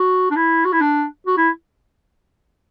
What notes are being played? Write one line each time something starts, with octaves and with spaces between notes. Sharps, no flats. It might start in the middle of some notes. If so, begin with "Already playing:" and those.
Already playing: F#4
D4
E4
F#4
E4
D4
F#4
E4